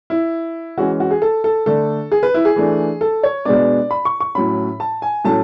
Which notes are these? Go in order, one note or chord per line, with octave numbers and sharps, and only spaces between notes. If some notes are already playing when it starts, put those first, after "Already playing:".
E4
E3 G#3 C#4 F#4
F#4
G#4
A4
A4
D3 A3 D4 A4
G#4
B4
E4
G#4
E3 A3 D4
A4
C#5
B2 G#3 B3 D4 D5
B5
C#6
C#6
A2 F#3 C#4 B5
A5
G#5
A2 F#3 A3 C#4 A5